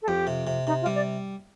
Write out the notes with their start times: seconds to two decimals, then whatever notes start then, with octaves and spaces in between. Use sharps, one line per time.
0.02 A4
0.08 F2 G4
0.27 C3
0.47 C3
0.66 C3 D#4
0.82 F4
0.86 G3
0.95 D5